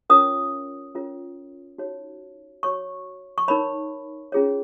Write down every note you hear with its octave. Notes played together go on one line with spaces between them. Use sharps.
C#4 F4 A#4 C#5 D#6
C#4 F4 A#4 C#5
D#4 F#4 C#5
F#4 C#5 C#6
C#6
D#4 A#4 C#5 B5
C#4 F4 G#4 C#5